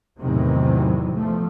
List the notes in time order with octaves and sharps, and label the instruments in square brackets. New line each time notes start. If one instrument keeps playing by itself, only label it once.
[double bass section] E2 A2 C3 D#3 E3 F#3
E2 F3 A3